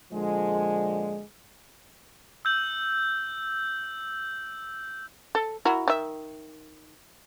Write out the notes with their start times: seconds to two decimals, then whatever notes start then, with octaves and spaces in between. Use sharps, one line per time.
0.12 A#2 D3 F3 G#3
2.45 E6 G6 F#7
5.35 A4
5.65 E4 F#4 A#4
5.88 D#3 E5